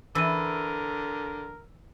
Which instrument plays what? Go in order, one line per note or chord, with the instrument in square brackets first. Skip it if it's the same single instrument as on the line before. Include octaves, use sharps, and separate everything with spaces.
[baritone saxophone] D3 [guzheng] E3 [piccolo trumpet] A#4 [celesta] E6 D#7